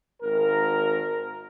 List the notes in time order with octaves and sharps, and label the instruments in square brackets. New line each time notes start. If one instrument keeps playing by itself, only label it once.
[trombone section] G#1 A#4